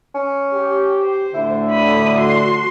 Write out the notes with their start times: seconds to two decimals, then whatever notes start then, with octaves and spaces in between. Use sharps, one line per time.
0.14 C#4
0.54 G4
1.02 C5
1.34 D2 A2 D3 E4
1.70 B5 D#6
2.19 F#4 C6